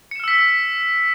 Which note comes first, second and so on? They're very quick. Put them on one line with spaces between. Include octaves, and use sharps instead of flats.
C#7 E7 F6 E6 B6